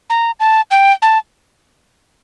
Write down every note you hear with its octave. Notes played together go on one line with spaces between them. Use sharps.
A#5
A5
G5
A5